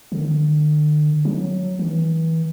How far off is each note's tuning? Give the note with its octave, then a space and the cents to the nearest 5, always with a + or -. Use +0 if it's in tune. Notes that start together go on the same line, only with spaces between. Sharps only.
D3 +45
F#3 -5
E3 -30